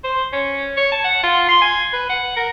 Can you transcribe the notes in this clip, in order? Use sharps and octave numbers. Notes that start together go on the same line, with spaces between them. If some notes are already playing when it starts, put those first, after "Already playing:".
C5
C#4
C#5
A5
F#5
F4
C6
G#5
B4
F#5
A#4